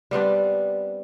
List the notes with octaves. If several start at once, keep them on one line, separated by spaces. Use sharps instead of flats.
G3 B3 C4 D4